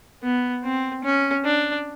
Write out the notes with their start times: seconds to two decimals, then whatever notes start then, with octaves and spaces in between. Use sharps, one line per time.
0.23 B3
0.64 C4
1.04 C#4
1.45 D4